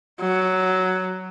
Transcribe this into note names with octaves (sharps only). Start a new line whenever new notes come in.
F#3